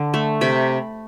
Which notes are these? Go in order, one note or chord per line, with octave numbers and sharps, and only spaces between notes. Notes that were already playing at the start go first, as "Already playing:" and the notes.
Already playing: D3
A3
C3 B5